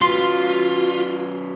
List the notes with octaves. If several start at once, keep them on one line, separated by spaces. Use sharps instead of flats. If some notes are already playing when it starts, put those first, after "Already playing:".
F#3 C#4 F4 F#4 B4 C6